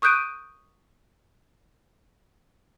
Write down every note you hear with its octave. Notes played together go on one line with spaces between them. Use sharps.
C#6 D#6 F#6 G6 D7 D#7